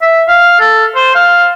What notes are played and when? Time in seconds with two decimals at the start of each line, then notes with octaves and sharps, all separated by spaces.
0.01 E5
0.28 F5
0.60 A4
0.95 C5
1.15 F5